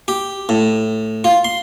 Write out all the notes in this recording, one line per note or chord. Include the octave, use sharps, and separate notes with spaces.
G4
A2
F4
C6